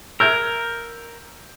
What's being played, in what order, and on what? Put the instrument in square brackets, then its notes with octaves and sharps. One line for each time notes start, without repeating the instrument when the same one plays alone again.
[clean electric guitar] A#4 [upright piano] E6 G6 G#6